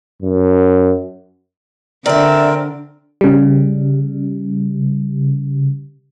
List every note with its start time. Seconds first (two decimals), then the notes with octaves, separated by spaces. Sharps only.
0.22 F#2
2.06 D3 C4 A#4 D5 E5
3.21 C#3 G3